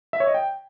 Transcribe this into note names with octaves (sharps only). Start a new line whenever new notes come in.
E5
C#5
D#5
G5